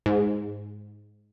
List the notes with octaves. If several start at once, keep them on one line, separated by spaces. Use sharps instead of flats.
G#2